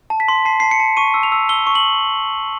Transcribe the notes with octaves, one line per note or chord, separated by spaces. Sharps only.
A5
B6
C6
A5 C7
A5 C7
C#7
A5
C#6 D#7
E6
F7
E6
E6 G7
C#6
F#7